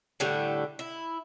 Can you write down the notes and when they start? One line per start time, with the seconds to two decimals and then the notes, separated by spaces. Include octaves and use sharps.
0.20 A2 D3 G3 A3
0.79 E4